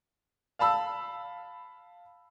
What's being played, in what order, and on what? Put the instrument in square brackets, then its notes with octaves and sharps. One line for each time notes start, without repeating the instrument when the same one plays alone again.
[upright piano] F5 A5 B5 E6